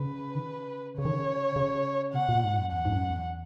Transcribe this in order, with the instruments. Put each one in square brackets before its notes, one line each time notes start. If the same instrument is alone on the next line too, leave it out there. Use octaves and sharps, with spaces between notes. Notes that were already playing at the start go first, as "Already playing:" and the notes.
Already playing: [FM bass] C#3 [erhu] B4
[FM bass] D#3
C#3
[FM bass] C#3 [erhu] C#5
[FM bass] D#3
C#3
C#3
[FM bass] B2 [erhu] F#5
[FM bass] A#2
G#2
F#2
[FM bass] E2 [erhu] F#5
[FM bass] G#2
F#2
E2